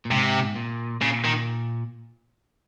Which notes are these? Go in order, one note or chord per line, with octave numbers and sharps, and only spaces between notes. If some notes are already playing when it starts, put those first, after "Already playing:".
A#2
G#2 C3
A#2
A#2 C#3
D#3